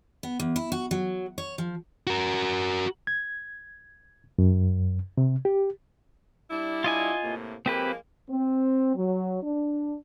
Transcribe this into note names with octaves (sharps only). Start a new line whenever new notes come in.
B3
E2
E4
F#4
F#3
C#5
F3
F#4 A#4
G#6
F#2
C3
G4
G3 D4 E4
F4 D#5 G#5
A2 C3 A#3
F3 G#3 A#3 C4 G4 B4
C4
F#3
D4